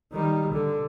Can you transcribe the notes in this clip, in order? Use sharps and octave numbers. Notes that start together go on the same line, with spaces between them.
D#3 G3
D3